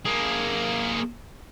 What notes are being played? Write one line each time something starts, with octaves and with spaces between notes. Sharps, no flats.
A#3 G#4